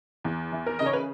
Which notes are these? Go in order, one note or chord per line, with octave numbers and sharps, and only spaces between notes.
E2
E3
A#4
C#3 D#5
C#5
B4